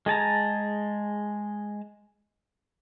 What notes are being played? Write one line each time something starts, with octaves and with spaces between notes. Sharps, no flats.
G#3 G#4 A5 A#5